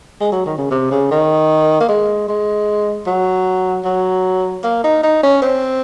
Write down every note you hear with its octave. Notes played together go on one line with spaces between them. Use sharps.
G#3
F#3
D#3
C#3
C3
C#3
D#3
A#3
G#3
G#3
F#3
F#3
A#3
D#4
D#4
C#4
C4